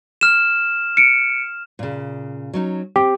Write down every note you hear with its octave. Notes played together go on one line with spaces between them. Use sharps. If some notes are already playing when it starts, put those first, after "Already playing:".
F6 E7
C#7 D7
A#2 C#3
F#3 C#4 D#4
C4 G4